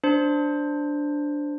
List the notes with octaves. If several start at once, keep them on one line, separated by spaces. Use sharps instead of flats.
D4 C5